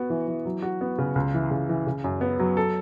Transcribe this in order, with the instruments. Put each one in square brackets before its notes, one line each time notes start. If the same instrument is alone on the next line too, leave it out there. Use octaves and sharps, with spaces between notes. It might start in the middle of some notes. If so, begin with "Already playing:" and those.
Already playing: [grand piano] B3 F#4
E3
E3
F#3
F#4
B3
C#3
C#2
E3
C#2
E3
C#3
F#2
B3
F#3
A4